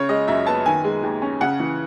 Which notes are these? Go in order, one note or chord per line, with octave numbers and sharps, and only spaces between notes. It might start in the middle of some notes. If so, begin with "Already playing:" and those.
Already playing: C#3 C#5
G#3 D#5
F#2 E5
B3 A5
D#3 G#5
G#3
D#2
C#4
C#3 F#5
E3